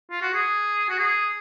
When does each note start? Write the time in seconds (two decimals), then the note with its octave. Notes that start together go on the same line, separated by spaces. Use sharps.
0.11 F4
0.22 F#4
0.34 G#4
0.89 F#4
0.98 G#4